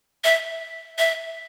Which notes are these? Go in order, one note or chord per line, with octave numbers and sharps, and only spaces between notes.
E5
E5